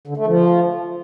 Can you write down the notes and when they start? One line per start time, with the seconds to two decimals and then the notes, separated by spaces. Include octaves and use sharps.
0.08 D3
0.17 A3
0.27 F3